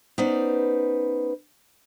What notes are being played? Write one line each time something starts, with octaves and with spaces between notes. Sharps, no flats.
B3 C#4 D#4 B4 C5 D5